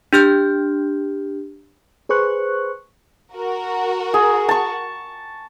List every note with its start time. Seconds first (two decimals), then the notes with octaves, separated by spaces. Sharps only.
0.13 D4 G4 F6 G6
2.09 G#4 B4 C5 C#6 F#6
3.35 F#4 A#4
4.14 G#4
4.49 A5 C#6